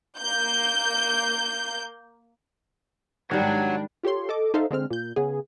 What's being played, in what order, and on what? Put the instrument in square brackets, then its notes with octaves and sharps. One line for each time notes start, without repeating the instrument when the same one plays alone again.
[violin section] A#3 G6
[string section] G#2 D4 [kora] D#3 G3 [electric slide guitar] F#3
[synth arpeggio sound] F4 G4 A4 C#5 C6
A4 D#5 D6
D#4 A4 C5 E5 F5
D3 G#3 C4 F6
A#2 G6
C#3 B3 G#4